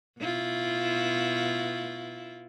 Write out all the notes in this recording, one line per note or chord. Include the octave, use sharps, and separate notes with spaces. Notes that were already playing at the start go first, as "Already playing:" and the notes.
B2 E4 F4